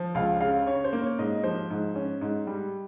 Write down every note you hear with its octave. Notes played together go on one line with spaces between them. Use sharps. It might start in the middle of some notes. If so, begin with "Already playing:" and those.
Already playing: F3
C#2 F5
C#3 F5
C#4 C#5
C5
A#3
C#5
G#2 D#5
F3 C5
G#2
C#4
G#2
G3